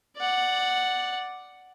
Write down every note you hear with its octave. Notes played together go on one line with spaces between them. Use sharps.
D5 F#5